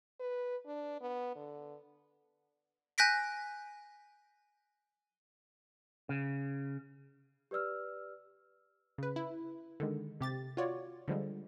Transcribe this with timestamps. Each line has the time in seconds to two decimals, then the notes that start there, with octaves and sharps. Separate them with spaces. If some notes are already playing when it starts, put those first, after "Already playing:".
0.20 B4
0.67 D4
1.01 B3
1.36 D3
2.98 G#5 F#6 G6 A#6 B6 D7
6.09 C#3
7.51 G4 B4 D5 E6 F6
8.98 C#3 B4
9.16 E4
9.80 D3 D#3 G#3
10.21 C3 G4 A6
10.57 F4 F#4 C#5 D5
11.08 D3 F3 G3 G#3